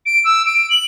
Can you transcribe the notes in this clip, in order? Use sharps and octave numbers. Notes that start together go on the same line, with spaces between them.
D7
E6
D7
F#7